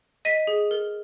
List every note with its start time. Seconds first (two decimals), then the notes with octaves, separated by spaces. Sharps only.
0.25 D#5 B6 D#7
0.47 G#4
0.71 A#4